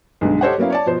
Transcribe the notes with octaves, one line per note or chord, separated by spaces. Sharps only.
B1 G2 D3 G#3
G4 A4 C5 C#5 D#5 F#5
F#3 A#3 B3 C#4 E4 F5
C#5 D5 A5
B2 F3 C5